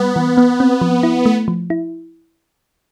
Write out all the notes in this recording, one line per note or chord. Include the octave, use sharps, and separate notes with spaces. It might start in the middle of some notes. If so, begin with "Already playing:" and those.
Already playing: G3 B3
E3
B3
C4
F3
E4
A3 B3
F3
E4